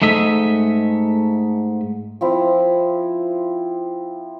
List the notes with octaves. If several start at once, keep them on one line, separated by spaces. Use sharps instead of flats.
G#2 A3 D#5 E5
F3 C4 E4